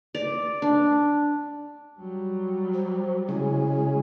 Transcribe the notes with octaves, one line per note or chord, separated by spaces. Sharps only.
D5
D4
F#3 G3
C5
C#3 G#3 E4